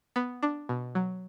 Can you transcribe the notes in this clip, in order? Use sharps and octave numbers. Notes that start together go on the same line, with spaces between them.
B3
D4
B2
F#3